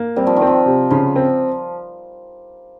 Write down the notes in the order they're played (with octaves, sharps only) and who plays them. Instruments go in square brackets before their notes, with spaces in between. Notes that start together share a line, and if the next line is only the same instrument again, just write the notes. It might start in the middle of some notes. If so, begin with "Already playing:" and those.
Already playing: [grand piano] A#3
[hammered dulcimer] G3 [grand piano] C4
[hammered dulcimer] F3
D#3
[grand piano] C4
[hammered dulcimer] F3
[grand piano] C3
[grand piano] C#3 [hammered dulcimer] F3
[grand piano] C4